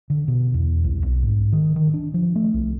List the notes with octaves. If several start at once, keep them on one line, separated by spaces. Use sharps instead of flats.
D3
B2
E2
C2
B1
G#2
D#3
D#3
D4
F3
A3
C2